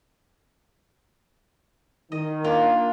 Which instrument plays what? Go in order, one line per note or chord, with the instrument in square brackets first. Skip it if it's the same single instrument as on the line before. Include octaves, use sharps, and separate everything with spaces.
[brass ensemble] D#3 [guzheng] D#5
[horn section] A#3 D4 [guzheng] F4